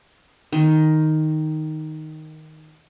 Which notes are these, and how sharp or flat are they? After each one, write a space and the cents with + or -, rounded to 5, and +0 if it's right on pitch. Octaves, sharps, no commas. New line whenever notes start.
D#3 +0